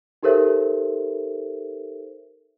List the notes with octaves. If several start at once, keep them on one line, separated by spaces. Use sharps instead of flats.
D#4 G4 A4 A#4 C5 E5